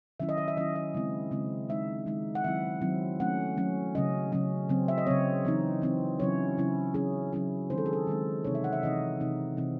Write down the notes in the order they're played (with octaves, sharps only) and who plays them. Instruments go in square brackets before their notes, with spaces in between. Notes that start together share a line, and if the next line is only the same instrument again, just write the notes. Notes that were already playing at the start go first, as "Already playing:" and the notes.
[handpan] D#3 F#3 C#4 E4 E5
D#5
E5
E5
D#3 F#3 C#4 E4 D#5
E5
C#3 G#3 C4 E4
C#3 G#3 C4 E4
D#3 G#3 D#4 E5
D#3 G#3 D#4
F#5
D#3 F#3 C4 E4 E5
D#3 F#3 C4 E4
F#3 A3 C#4 F#5
F#3 A3 C#4
C#3 F#3 C#4 D#5
C#3 F#3 C#4
C#3 F#3 C4
E5
D#5
C#3 F#3 C4 C#5
E3 C4 D#4
E3 C4 D#4
C#3 F#3 C#4 E4 C#5
C#3 F#3 C#4 E4
C#3 F#3 C#4 E4 G#4
C#3 F#3 C#4 E4
D#3 G#3 C4 D#4 C5
A4
G#4
A4
D#3 G#3 C4 D#4
C3 E3 C4 D#4 C#5
E5
F#5
E5
C3 E3 C4 D#4 D#5
C3 E3 C4 D#4
C3 E3 C4 D#4